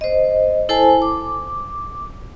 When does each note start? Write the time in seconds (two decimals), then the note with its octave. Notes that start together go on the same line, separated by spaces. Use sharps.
0.01 C5 D#5
0.69 E4 A4 C5 G#5 A5
1.02 D6